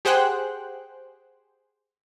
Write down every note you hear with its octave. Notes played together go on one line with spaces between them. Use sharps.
G4 G#4 C5 F#5 G5 F#6